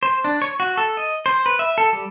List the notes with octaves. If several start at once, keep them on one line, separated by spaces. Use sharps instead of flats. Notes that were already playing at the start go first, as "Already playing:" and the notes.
C5
D4
C#5
F#4
A4
D#5
C5
B4
E5
A4
G3